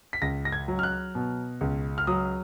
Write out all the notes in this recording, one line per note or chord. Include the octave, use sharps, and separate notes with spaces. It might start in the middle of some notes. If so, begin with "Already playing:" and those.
B6
C#2 A#6
A#6
G#6
F#3
F6
F#6
B2
C#2
F6
F#3 D#6